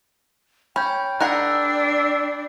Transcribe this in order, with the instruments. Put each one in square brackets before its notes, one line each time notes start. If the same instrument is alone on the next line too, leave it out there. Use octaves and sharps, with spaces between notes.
[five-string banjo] C#4 [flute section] G5 [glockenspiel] B5 G6
[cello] D4 [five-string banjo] G#4 A#4 F#5 [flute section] G5 E6 [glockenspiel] F#6